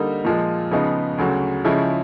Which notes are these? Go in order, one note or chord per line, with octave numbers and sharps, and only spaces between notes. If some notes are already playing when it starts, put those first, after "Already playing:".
Already playing: D3 G3 A#3 D#4
A#2 F3 G#3
C#3 F3 G#3 B3 D#4
D2 C#3 F#3
C#3 F3 G#3 C#4 E4